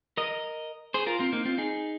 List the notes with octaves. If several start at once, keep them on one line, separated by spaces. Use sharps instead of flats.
A#4 D#5
G#4 C5
F4 A#4
C4 F4
A#3 D#4
C4 F4
D#4 G#4